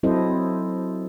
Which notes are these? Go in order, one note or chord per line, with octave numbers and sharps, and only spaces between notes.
F#3 C4 E4 A4 C5 D#5